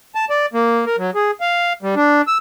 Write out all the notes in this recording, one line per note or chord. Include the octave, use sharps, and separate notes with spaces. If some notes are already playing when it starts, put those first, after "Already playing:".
A5
D5
A#3
A#4
F#3
G#4
F5
G3
D4
E6